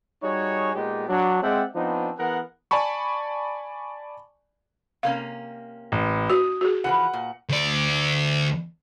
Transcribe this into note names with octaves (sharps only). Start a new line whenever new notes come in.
G3 D#4 F#4 G#4 C#5
A#2 G#3 B3 D#4 G4
F#3 D4
G#3 C4 D5 E5 F#5 G5
F3 B3 C4 D4 D#4
E3 B3 G#4 A#4 F#5
D5 G#5 A5 B5 C#6
C3 A#3 C#4 F5
A1
F#4 D#6
F#4 G#4
E3 F3 B4 F#5
A#2
D2 D5